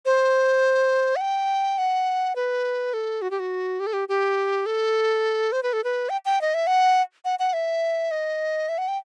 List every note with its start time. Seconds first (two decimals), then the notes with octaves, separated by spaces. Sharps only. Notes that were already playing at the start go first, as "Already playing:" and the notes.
0.05 C5
1.16 F#5
1.21 G5
1.78 F#5
2.36 B4
2.94 A4
3.22 F#4
3.31 G4
3.39 F#4
3.80 G4
3.87 A4
3.93 G4
4.09 G4
4.66 A4
5.52 C5
5.63 B4
5.73 A4
5.84 B4
6.09 G5
6.25 G5
6.41 D#5
6.54 E5
6.67 F#5
7.25 F#5
7.39 F#5
7.53 E5
8.11 D#5
8.69 E5
8.78 F#5
8.88 G5